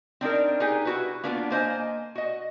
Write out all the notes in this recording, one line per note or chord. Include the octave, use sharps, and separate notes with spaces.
C4 D4 D#4 A#4
D#4 G4 G#4 B4 G#5
E4 F#4 B4
A#3 B3 D4 F4 A4 B4
A#3 C5 D#5 G#5
F#4 D#5